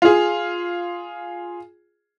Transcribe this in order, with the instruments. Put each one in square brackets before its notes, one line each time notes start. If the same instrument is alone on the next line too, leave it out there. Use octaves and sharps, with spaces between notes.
[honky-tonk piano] F4 G#4